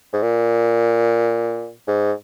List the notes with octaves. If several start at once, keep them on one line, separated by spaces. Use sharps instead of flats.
G#2
A#2
G#2